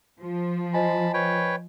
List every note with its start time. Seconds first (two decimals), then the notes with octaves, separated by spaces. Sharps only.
0.20 F3
0.73 C5 D#5 G#5 A5 B5
1.14 B4 C#5 G5